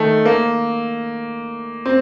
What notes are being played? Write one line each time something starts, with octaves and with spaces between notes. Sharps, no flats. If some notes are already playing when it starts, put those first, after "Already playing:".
Already playing: D#3 A3
A#3
C4